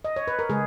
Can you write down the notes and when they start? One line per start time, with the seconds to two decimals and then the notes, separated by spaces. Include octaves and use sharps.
0.05 D#5
0.16 C#5
0.28 B4
0.39 A#4
0.49 C#3 G#3 G#4